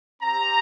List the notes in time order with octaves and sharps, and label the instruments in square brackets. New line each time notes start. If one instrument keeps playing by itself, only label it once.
[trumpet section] C4 G4 A#5